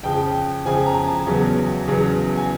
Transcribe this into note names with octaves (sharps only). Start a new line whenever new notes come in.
F2 C#3 F3 G5
F2 C#3 F3 G#5
A#5
A5
E2 C#3 F#3 B3
E2 C#3 F#3 B3
G#5